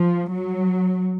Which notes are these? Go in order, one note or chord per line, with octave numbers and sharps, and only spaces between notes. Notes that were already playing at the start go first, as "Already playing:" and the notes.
Already playing: F3
F#3